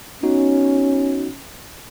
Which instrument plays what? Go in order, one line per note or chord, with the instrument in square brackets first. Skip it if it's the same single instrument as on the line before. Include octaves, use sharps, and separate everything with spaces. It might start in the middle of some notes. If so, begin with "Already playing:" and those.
[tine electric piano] B3 D#4 F#4 [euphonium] C#4